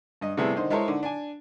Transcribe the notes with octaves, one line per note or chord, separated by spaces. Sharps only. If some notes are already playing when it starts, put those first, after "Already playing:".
G2 D#5
C3 G3 A3 B3 E4 G#4
D3 D#3 D#4 C5
G#3 E4 A4 A#4 C5 C#5
D3 D#3
D4 G#5